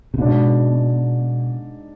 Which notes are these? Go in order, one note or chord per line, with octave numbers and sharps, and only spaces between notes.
C3
G#2 B2 G#3 D4